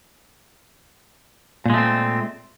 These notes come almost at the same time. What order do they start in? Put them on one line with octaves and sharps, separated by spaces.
A#2 G#3 A3 C4